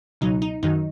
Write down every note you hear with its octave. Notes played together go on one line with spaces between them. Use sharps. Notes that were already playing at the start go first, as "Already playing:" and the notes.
C#2 B2 F#3 D#4
D#4
F#2 D#3 F#3 D#4